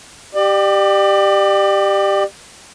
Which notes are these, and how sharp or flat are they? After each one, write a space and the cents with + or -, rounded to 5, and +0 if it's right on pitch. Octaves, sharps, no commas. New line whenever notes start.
G4 +0 D5 +35